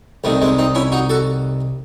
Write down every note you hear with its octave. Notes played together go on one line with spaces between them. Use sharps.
C2 C3 D#3 A3
G#3 C4
C4 D#4
C#4 E4
D#4 F#4
F#4 A4